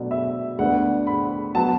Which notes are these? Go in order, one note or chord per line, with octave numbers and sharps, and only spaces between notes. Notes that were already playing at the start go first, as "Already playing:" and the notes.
Already playing: B2 F#3 A3 D4
E5
D2 D3 B3 D4 F#5
B5
F#3 B3 A5